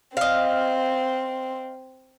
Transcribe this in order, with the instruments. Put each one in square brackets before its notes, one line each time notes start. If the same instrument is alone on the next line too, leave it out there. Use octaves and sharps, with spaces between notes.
[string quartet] C4 [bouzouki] D#5 F5